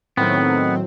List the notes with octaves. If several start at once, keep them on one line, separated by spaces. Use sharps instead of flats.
A2 D#3 F#3 B3 C4